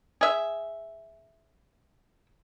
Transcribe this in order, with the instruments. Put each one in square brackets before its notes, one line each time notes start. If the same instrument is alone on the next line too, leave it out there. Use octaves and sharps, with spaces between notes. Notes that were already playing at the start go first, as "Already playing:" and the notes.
[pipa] G#4 E5